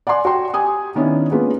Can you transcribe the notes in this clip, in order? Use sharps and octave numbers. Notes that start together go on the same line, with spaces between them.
D5 F#5 G#5 C6 D6
F#4 G5 C6
G4 G#5 D#6
D#3 B3 C#4 D4 E4
G#3 A#3 B3 C#4 F4 B4